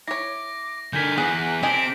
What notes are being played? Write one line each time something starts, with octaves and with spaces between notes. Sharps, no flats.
E4 C#5 D6 A#6
D3 A#4 G#5 G6 B6
E2 B3 G#4 F#6
C4 G4 A4 D#5 G#5 D7